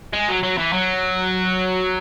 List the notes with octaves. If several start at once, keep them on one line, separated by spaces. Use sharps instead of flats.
G#3
F#3
F#3
E3
F#3